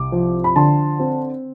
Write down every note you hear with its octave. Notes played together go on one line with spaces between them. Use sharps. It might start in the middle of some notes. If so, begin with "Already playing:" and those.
Already playing: C2 D6
F3
B5
D3 A5 C6
C4